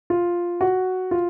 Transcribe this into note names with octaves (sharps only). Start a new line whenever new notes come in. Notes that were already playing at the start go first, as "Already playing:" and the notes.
F4
F#4
F4